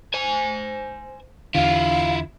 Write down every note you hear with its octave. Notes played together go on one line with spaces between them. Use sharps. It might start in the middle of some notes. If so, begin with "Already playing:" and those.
C5 G#5
E2 D3 E4 F4 F5